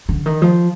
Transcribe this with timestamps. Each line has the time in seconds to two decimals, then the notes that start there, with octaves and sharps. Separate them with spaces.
0.09 D3
0.26 D#3
0.42 F3